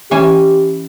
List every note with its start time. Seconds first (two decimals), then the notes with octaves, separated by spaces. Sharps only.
0.11 E3 C#4 G4 G#5